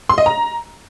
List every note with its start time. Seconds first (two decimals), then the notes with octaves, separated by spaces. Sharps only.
0.09 C6
0.18 D#5
0.26 A#5